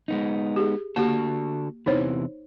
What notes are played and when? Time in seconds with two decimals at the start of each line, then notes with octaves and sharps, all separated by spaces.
0.08 G#3 B3 D#4
0.56 G4 G#4
0.96 D3 A#3 F#4 G4 A5
1.86 E2 C3 E3 D#4 C5 C#5